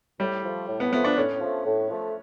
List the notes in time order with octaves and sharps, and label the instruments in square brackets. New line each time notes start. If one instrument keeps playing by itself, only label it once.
[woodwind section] A2 [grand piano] G3
[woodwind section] F3 A3
A2
[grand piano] B3
[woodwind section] F3 A3 [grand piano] B3
[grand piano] D4
[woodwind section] A2 [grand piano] C#4
[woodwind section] F3 A3
A2
F3 A3